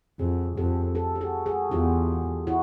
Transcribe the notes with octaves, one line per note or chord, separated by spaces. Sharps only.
F2 F#4 G#4
F2 G4 A4
G4 A4
G4
F#4 G#4
F#4 G#4
E2 F4 G4
E4 F#4